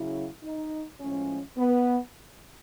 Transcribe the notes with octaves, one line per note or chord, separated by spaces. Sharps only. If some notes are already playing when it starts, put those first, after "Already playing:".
Already playing: C#3 F#3 E4
D#4
A2 F3 G#3 C#4
B3